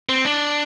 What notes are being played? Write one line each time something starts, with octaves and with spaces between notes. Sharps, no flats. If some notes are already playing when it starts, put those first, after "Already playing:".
C4
D4